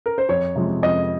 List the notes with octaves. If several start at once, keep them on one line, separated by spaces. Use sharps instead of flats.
A#4
C5
F2 C#5
C3 F3 G#3
F2 D#5